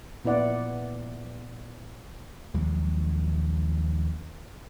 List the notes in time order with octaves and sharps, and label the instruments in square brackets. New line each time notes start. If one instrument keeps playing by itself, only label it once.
[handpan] A#2 B3 E4 D5 F#5
[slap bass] A#1 D#2 F#3 G#3